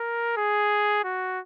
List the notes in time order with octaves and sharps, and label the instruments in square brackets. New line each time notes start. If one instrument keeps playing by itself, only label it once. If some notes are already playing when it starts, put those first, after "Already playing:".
Already playing: [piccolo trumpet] A#4
G#4
F#4